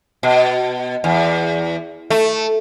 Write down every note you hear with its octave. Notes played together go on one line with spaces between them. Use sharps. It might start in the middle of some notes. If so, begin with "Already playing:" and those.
B2
E2
A3